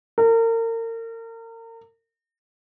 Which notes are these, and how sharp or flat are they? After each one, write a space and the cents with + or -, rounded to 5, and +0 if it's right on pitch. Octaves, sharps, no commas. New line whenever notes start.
A#4 -35